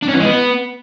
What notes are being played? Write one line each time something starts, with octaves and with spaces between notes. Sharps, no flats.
D4
C#4
E3
G#3
B3